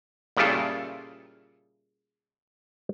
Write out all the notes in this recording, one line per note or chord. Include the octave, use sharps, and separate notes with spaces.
A#2 C#3 G3 E4 F4 A4